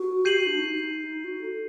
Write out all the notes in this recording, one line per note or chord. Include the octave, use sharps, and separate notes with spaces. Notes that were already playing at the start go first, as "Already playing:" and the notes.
Already playing: F#4
G4 G6 C7 D#7 F#7
F#4
D4
D#4
F#4
A4